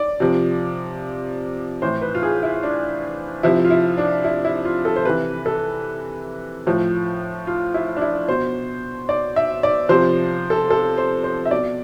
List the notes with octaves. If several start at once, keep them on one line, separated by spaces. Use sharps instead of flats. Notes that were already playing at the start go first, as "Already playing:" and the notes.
Already playing: D5
C3 F3
A2 E3 C5
B4
F4
G#4
E4
D4
C3 F3 E4
F4
E4
D4
E4
E4
F4
A4
C5
C3 E3 B4
A4
A2 F3
F4
E4
D4
E4
B2 C5
D5
E5
D5
C3 F3 C5
A4
A4
C5
C5
E5
B2 D5